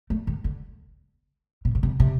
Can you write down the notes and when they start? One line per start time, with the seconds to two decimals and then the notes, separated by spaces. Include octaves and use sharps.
0.10 A3
0.27 D#3
0.44 D3
1.65 B2
1.75 C#3
1.83 C3
2.00 C3